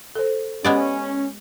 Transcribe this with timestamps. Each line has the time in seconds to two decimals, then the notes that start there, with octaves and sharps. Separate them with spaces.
0.16 A4 C5
0.64 G#3 B3 C#4 G4 D5